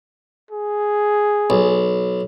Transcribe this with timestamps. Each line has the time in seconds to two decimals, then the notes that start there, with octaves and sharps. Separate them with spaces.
0.51 G#4
1.50 B1